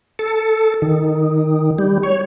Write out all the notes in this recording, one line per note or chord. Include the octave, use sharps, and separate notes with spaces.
A4
D#3
G3
C#5